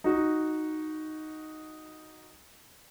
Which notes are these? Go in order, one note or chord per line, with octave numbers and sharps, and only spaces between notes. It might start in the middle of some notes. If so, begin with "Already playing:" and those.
D#4 F#4